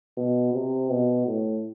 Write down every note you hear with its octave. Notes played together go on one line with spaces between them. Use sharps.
B2
C3
B2
A2